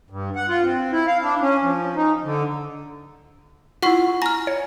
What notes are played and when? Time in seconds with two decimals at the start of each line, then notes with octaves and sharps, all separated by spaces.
0.10 G2
0.36 F#5
0.49 F4
0.64 C4
0.92 E4
1.07 F5
1.23 D4
1.41 C#4
1.62 F3
1.95 D#4
2.24 D3
3.82 E4 F4 F#5 C#6 C7
4.22 G#5 A#5 F6 A#6
4.47 C#5